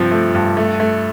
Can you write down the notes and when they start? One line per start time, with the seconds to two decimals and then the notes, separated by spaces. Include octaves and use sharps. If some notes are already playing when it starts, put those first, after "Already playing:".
Already playing: G2 C3 F3
0.11 A3
0.35 G2
0.57 A3
0.80 A3